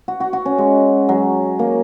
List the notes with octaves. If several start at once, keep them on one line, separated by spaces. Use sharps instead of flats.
F#4
F#4
F#4
C#4
G#3
F#3
A#3